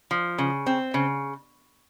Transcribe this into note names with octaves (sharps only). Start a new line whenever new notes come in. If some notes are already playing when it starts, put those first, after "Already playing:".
F3
C#3
C4
C#3